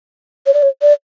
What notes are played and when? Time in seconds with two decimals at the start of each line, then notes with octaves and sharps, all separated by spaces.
0.46 C#5
0.54 D5
0.63 C#5
0.82 D5